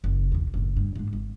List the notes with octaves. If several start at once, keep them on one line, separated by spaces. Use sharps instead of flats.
F#1 E2
B1 E2
F#1 A2
G2
G#2 D4
G#1